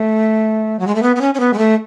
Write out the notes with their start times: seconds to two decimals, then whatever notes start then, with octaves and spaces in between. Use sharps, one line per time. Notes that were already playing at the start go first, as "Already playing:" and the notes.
Already playing: A3
0.79 F#3
0.87 G#3
0.95 A3
1.03 B3
1.16 B3
1.21 C#4
1.34 C#4
1.40 B3
1.53 G#3
1.58 A3